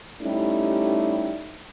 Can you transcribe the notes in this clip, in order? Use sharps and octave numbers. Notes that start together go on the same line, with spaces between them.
G3 A3 C#4 D#4 E4 G4